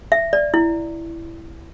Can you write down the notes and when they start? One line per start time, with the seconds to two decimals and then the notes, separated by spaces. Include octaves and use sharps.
0.12 E5
0.33 D5
0.54 E4